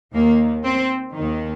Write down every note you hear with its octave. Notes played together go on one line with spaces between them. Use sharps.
D#2 D#3 A#3
C4
D#2 D#3